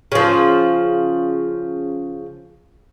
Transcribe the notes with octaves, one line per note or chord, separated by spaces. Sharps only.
C#3 F3